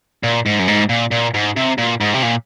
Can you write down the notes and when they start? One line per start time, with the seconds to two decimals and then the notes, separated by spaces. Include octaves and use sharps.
0.23 A#2
0.46 G#2
0.59 F#2
0.68 G#2
0.89 A#2
1.11 A#2
1.34 G#2
1.57 C3
1.78 A#2
2.01 G#2
2.14 C3
2.23 A#2